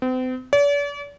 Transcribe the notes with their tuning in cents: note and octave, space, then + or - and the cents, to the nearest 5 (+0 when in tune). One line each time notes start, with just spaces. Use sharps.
C4 -40
D5 -45